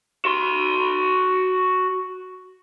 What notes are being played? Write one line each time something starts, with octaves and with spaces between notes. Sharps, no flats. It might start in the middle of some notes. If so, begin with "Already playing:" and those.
F#4 C6